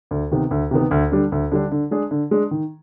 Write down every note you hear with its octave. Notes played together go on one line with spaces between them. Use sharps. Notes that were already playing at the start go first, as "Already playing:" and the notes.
D2
C3 D#3 B3
D2
C3 D#3 B3
D2
D3 G3 D4
D2
D3 G3 D4
D3
G#3 D4 G#4
D3
G#3 D4 G#4
D#3